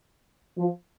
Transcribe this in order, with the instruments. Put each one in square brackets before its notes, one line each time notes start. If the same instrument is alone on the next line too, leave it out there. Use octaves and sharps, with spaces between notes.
[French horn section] F3